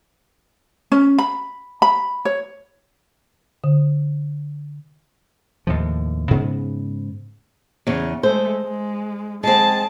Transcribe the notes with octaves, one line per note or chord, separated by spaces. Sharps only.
C#4
B5
B5
C#5
D3
D#2 A2 F3
G#2 C#3 B3
E2 C#3
G#3 A3 C5
G#3
G#3 C4 G#4 A5